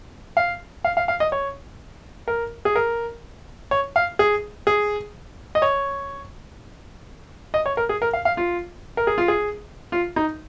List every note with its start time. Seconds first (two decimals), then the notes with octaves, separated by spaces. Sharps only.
0.37 F5
0.84 F5
0.97 F5
1.08 F5
1.20 D#5
1.32 C#5
2.28 A#4
2.65 G#4
2.76 A#4
3.71 C#5
3.96 F5
4.19 G#4
4.67 G#4
5.55 D#5
5.62 C#5
7.54 D#5
7.66 C#5
7.77 A#4
7.89 G#4
8.02 A#4
8.13 F5
8.25 F5
8.37 F4
8.97 A#4
9.07 G#4
9.18 F4
9.28 G#4
9.92 F4
10.16 D#4